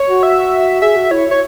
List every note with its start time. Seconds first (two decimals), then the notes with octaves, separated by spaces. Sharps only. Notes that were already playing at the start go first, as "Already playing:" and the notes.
Already playing: C#5
0.08 F#4
0.23 E5
0.82 G#4 E5
0.96 F#4
1.11 E4 C#5
1.31 C#5